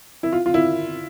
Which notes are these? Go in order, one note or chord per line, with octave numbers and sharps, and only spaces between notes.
E4
F4
F4
E4